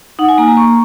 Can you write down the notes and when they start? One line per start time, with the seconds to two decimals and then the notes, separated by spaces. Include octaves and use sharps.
0.19 D#4 F#5
0.29 G#5
0.38 A#3 A#5
0.48 A#5
0.57 A#3 C#6